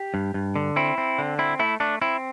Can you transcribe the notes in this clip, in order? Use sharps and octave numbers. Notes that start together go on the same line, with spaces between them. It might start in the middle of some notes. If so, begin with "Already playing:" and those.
Already playing: G4
G2
G2
D3
C4 E4
C4
D3
C4 E4
A3 E4
A3 D4
C4 E4